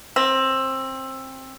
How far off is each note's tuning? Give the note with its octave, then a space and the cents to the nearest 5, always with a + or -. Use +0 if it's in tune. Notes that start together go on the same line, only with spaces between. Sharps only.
C4 +20